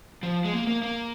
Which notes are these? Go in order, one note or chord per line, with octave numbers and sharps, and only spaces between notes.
F3
G#3
A#3
A#3
A#3